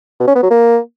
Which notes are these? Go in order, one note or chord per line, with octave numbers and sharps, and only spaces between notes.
B2
C#4
B3
F#3
A#3